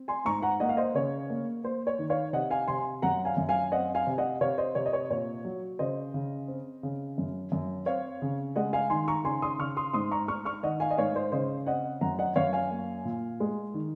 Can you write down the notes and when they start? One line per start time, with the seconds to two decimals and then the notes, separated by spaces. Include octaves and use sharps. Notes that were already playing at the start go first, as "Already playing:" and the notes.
Already playing: C4
0.08 G#5 C6
0.25 G#2 A#5 C#6
0.42 F#5 A#5
0.60 A#3 D#5 F#5
0.69 F5
0.77 C5 D#5
0.95 C#3 C#5
1.30 A#3
1.64 A#3 C5
1.87 C#5
1.99 D#3
2.10 C#5 F5
2.33 C3 D#5 F#5
2.50 F5 G#5
2.68 C3 G#5 C6
3.02 F#2 F#5 A#5
3.25 F5 G#5
3.37 F#2
3.49 F5 G#5
3.71 C4 D#5 F#5
3.95 F5 G#5
4.07 C3
4.18 D#5 F#5
4.41 C3 C#5 F5
4.58 C5 D#5
4.75 C3 C#5
4.86 D#5
4.93 C#5
5.10 A#2 C#5
5.45 F#3
5.79 C#3 C5 D#5
6.14 C#3
6.48 C4
6.83 C#3
7.18 F#2
7.52 F#2
7.86 C4 C#5 F5
8.22 C#3
8.56 G#3 D#5 F#5
8.73 F5 G#5
8.90 D#3 G#5 C6
9.08 A#5 C#6
9.24 C#3 G#5 C6
9.42 C6 D#6
9.59 C#3 C#6 F6
9.77 C6 D#6
9.93 G#2 C6 D#6
10.11 A#5 C#6
10.28 G#2 C#6 F6
10.45 C#6 F6
10.63 D#3 D#5 F#5
10.80 F5 G#5
10.91 D#5
10.97 G#2 C#5 F5
11.15 C5 D#5
11.32 C#3 C5 D#5
11.66 C4 D#5 F#5
12.01 F#2 F#5 A#5
12.19 D#5 F#5
12.36 F#2 C#5 F5
12.53 F5 G#5
12.71 A#3
13.05 A#2
13.40 G#3
13.74 D#3